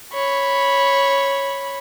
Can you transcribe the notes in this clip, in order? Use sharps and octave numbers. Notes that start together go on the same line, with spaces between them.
C#5 B5